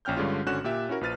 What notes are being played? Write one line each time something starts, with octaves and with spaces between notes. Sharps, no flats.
A#1 C#4 G5 F6 G6
G2 D3 G#3 C#4 F4
G#1 D3 C#4 F#4 F#6 E7
A#2 G4 E5
C#4 E4 F#4 A#4
A#1 F3 B4 F6 A6 D#7